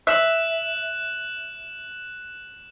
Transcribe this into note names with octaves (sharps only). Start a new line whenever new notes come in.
E5 F#6 E7 F#7